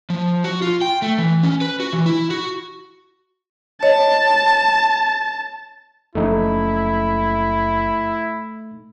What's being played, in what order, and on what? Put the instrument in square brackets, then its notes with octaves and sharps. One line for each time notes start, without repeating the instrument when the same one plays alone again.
[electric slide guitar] F3
F#4
F4
G5
A3
E3
C#4
B4
F#4
E3
E4
F#4
[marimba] C#5 D#5 [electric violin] A5
[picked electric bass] F#1 F3 C#4 [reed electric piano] A3 D#4 A4 [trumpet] E4